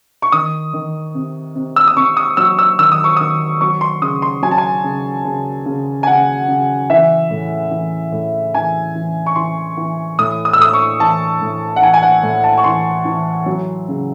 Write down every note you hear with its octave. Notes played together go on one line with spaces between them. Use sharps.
C#6
D#3 D#6
D#3
C3
C3
E6
D#6
C3 C#6
D#6
F#3 E6
E6
D#3 E6
D#6
C#6
D#3 D#6
F#3 C#6
C6
C#3 D#6
C6
F#3 G#5
A5
G#5
C#3
C#3
C#3
G#5
C#3 F#5
C#3
E3 E5
A2
E3
A2
E3 G#5
E3
C#6
E3 C6
E3
A2 D#6
D#6
E6
A2 D#6
C#6
E3 A5
A2
F#5
E3 G#5
G#5
F#5
A2
A5
C#6
E3 C6
E3
F#3
C#3